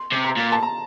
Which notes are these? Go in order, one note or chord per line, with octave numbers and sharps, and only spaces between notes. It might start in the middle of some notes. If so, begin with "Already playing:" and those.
Already playing: C6
C3
A#5
A#2
A5
A#5